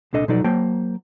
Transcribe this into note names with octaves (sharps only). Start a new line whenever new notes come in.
C2 A#2 D4 A4 D#5
B2 F3 F#3 D#4 A4 D5
F#3 A#3 C5 G5 A5